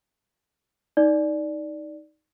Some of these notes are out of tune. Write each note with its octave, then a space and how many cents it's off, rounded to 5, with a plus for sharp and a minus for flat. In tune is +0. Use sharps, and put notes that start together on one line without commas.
D#4 +5 D5 +0